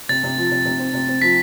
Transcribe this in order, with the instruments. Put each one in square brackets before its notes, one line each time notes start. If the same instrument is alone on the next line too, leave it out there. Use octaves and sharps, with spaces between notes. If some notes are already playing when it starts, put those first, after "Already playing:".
[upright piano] C3 [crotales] A6
[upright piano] C3
F3
C3
C3
C4
C3
C4
[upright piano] F3 [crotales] B6